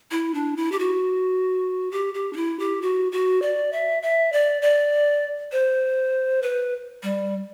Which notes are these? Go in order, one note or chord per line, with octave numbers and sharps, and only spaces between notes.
E4
D4
E4
G4
F#4
G4
G4
D4
E4
G4
F#4
F#4
D5
E5
E5
D5
D5
C5
B4
G3